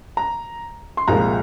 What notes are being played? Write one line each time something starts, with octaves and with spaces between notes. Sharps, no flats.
A#5
C6
C2 A#2 F3 G#3 A#5